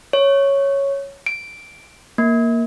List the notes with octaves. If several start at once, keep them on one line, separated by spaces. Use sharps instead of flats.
C#5
D7
A#3